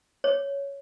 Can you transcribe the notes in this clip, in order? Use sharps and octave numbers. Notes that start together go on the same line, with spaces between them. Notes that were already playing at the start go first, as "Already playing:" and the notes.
C#5